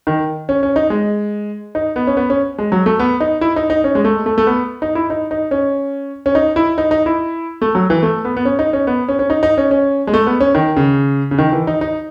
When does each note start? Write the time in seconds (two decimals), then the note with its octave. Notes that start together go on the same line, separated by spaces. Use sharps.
0.07 D#3
0.49 C#4
0.63 C#4
0.76 D#4
0.90 G#3
1.75 D#4
1.96 B3
2.07 C#4
2.17 B3
2.30 C#4
2.58 G#3
2.72 F#3
2.86 A3
2.99 B3
3.20 D#4
3.41 E4
3.56 D#4
3.70 D#4
3.84 C#4
3.95 G#3
4.04 A3
4.26 A3
4.38 A3
4.47 B3
4.82 D#4
4.95 E4
5.10 D#4
5.31 D#4
5.51 C#4
6.26 C#4
6.35 D#4
6.56 E4
6.78 D#4
6.91 D#4
7.06 E4
7.62 A3
7.75 F#3
7.90 E3
8.03 A3
8.25 B3
8.37 B3
8.45 C#4
8.59 D#4
8.73 C#4
8.87 B3
9.08 C#4
9.19 C#4
9.30 D#4
9.43 D#4
9.58 C#4
9.71 C#4
10.07 G#3
10.14 A3
10.27 B3
10.40 C#4
10.55 D#3
10.76 C#3
11.31 C#3
11.38 D#3
11.53 E3
11.67 D#4
11.81 D#4